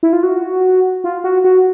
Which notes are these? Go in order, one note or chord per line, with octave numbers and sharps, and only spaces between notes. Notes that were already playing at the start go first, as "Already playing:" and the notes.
E4
F4
F#4
F4
F#4
F#4